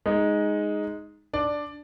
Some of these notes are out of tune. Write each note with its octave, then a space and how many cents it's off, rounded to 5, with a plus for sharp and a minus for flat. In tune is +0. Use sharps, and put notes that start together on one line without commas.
G#3 +0 D#4 +0
D4 +0 D5 +5